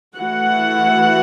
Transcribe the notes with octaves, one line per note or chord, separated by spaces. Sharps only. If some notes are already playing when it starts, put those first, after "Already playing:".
E3 A3 E4 F#4 F#5